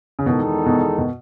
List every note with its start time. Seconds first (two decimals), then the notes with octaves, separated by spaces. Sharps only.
0.19 C#3
0.26 E2 B2 D#3 G#3 D#4 A4
0.66 B2
0.98 B2